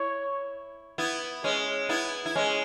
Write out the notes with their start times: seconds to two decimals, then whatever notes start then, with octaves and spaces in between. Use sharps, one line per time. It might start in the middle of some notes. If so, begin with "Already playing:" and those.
Already playing: E4 C#5
0.98 B3 E4
1.44 G#3 C#4
1.89 B3 E4
2.26 E4
2.36 G#3 C#4